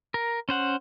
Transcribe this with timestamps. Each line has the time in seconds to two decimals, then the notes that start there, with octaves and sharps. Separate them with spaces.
0.14 A#4
0.49 C#4 C5 F#5